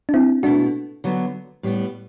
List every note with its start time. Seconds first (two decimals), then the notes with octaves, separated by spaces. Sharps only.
0.09 D4
0.14 C4 E4
0.43 B2 A3 D4 E4 F#4
1.04 D3 F#3 B3
1.63 A2 G3 B3